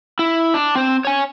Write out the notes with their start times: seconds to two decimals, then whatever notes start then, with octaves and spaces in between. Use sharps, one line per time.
0.19 E4
0.54 D4
0.75 C4 C5
1.05 C#5 G#5